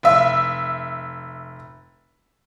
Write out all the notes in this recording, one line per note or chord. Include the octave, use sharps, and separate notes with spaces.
F1 E5